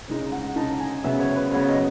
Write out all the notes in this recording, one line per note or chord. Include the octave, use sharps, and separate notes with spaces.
C#3 G#3 D#4
F#5
C#3 G#3 D#4 A5
G#5
C#3 F#3 B3 E5
C#5
B4
C#3 F#3 B3 C#5
D#5